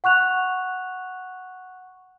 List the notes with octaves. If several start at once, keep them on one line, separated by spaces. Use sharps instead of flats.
F#5 C#6 F#6 F7